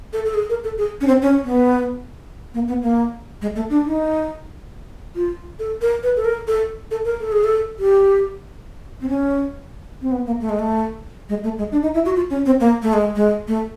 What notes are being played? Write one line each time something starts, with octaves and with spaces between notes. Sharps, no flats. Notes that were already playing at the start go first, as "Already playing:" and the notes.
A4
A4
G#4
A#4
A4
G#4
C#4
C4
C#4
B3
A#3
B3
A#3
G#3
A3
D4
D#4
F4
A4
A#4
B4
A4
A#4
A4
A4
A#4
A4
G#4
A4
G4
C4
C#4
C4
B3
A#3
A3
G#3
A3
G#3
A3
G#3
D4
D#4
E4
F#4
F4
C#4
C4
A#3
A3
G#3
G#3
A3